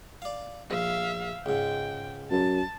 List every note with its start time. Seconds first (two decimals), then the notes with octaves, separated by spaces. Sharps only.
0.22 D5 F5
0.71 A#1 E5 F5
1.46 C#2 G#2 G5
2.31 F#2 A5